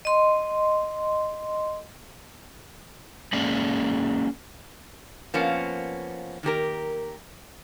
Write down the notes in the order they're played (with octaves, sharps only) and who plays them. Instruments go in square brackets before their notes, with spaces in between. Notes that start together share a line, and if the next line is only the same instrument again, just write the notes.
[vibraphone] D#5 C6
[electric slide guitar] G#3 A#3 C#4 G#4 D5
[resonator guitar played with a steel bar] F3 A#3 B3 C#4
D#3 A#3 G4 A#4